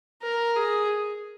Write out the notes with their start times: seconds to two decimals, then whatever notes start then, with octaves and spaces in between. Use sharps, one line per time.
0.22 A#4
0.56 G#4